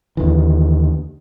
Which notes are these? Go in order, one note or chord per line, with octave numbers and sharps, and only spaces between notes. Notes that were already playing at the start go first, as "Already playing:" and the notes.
D#2 D3 E3